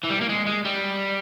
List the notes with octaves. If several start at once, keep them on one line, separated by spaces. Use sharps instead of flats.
E3
G3
A#3
G#3
G#3
G3